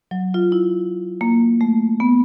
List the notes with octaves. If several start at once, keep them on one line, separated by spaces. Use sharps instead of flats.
F#3
F4
E4
A#3
A3
B3